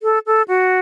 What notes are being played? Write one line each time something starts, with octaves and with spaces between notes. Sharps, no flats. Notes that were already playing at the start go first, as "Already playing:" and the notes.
A4
A4
F#4